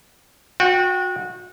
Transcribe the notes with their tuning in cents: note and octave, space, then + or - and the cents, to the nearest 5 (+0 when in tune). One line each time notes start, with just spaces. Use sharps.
F#4 -30 G5 +0